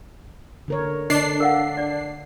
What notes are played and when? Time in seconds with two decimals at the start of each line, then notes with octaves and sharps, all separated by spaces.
0.68 D3 A#4 C#5
1.10 D3 D4 D#5 C7
1.40 A#4 F5 F#5
1.77 D5